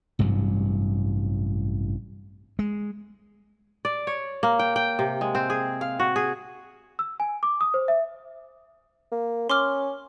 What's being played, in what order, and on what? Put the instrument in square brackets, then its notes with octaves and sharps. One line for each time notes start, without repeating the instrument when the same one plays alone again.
[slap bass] A1 G2 C3 F#3
G#3
[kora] D5
C#5
A#3
G5
G5
C3
G#3
C4
G#4
F5
F#4
G#4
[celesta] E6
G#5
D6
D#6
C5
E5
[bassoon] A#3
[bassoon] C#4 [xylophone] C6 D6 F6